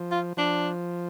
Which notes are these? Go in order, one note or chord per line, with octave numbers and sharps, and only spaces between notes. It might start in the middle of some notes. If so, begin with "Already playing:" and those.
Already playing: F3
F4
F3 D4